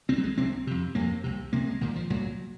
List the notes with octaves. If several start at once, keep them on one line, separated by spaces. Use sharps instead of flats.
C2 C3 C4
F#3
G#3
C2 C3 C4
F2 C3
F2 C3 A#3
C2 C3
C2 C3 A#3
G#3
C2 A#2 D#3
F3
C2 A#2 F#3